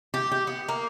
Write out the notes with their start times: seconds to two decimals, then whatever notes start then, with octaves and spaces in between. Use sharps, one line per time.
0.14 G4
0.32 G4
0.47 B3
0.68 A#3